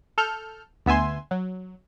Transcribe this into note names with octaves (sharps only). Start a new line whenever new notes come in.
A4 F6 G6
D2 B3 E5 G#5 C6
F#3